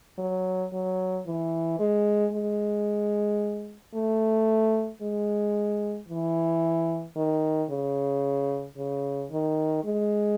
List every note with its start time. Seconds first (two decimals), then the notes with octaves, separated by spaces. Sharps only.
0.18 F#3
0.72 F#3
1.26 E3
1.79 G#3
2.33 G#3
3.94 A3
5.02 G#3
6.08 E3
7.16 D#3
7.70 C#3
8.77 C#3
9.31 D#3
9.84 G#3